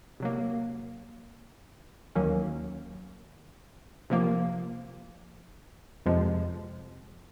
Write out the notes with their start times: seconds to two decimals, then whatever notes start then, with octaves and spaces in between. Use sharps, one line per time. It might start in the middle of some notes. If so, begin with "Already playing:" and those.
0.20 C3 F#3 A#3
2.15 D#2 D#3 F#3 A#3 C#4
4.10 C3 F3 A#3
6.06 F2 C3 F3 G#3